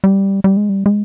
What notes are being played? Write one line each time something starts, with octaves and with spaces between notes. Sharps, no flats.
G3
G3
G#3
G3
G#3